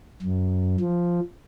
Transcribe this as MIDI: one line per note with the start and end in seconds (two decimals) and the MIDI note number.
0.22 0.76 42
0.80 1.20 53